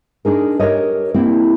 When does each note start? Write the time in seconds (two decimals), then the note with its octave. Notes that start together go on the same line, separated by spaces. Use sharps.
0.25 D4 D#4 G#4 A#4
0.60 G4 A#4 B4 C#5 D#5
1.14 A#3 C4 E4 G4